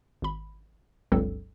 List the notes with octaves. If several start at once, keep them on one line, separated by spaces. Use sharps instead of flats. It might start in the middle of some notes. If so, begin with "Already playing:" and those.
G#1 B5
G1 C#2 G2 F#3 C4 A4